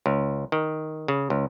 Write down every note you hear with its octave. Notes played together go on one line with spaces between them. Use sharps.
C#2
D#3
C#3
C#2